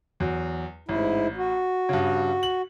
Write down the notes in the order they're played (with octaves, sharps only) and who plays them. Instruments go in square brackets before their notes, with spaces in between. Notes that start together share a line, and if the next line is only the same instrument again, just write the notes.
[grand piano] E2 F#3
[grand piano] A1 [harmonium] G#2 E4
[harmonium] F#4
[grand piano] G2 C#3
F#7